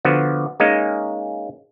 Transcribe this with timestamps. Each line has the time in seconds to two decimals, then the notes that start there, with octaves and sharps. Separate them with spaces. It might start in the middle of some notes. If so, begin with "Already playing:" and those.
0.05 D3 F3 B3 F#4
0.60 G#3 A#3 C#4 D#4